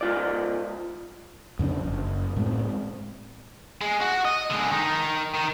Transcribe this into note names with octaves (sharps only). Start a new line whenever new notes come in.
G#2 F4 D5
F2 C#3 C4 D4
F#1
A2 G#3 C4
G#3
F#4
D#5
D3 G#3
D#3 D#4
D#3